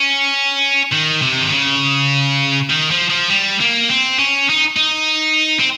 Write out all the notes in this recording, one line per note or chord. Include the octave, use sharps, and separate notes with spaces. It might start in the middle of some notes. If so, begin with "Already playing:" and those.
Already playing: C#4
D#3
C3
D#3
C#3
D#3
F3
F3
G3
A#3
C4
C#4
D#4
D#4
C4